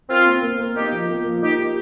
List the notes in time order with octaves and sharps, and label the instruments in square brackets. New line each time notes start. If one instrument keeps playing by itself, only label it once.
[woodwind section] C4 F4 [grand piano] A#4
[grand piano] A#3
A#3
A#4
[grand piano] A#3 [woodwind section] D#4 G4
[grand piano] F3
A#3
F3
[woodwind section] D#4 G4 [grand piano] A#4
[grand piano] G4